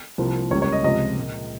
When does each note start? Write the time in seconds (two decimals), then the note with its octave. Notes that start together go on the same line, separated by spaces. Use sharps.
0.18 C2 C3 F3 A#3
0.51 C#2 C#3 G3 A#3 C#5
0.62 C#5
0.72 D#5
0.84 C#2 C3 F3 G#3 D#5
1.17 A#2 G#3